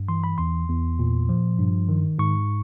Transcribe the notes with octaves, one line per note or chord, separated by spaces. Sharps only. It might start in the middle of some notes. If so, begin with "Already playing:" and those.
Already playing: G2
E3 C6
B5
E2 C6
E2
A#2
F3
G2
D#3
G#2 C#6